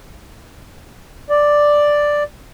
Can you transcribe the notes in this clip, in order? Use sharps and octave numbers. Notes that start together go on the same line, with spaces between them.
D5